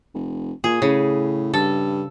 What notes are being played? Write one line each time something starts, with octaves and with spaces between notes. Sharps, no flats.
F1
A#2 G#4
A2 C#3
G2 A4